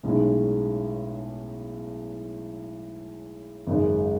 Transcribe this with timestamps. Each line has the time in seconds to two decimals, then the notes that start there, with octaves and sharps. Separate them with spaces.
0.03 B1 A2 G#3 C#4
3.67 G#1 F#2 C#3 G#3